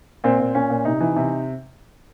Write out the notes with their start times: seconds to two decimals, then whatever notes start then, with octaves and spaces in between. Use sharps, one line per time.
0.24 A#2 C4
0.39 A#2
0.55 A#2 C#4
0.70 A#2
0.85 C3 D#4
1.01 E3
1.16 C3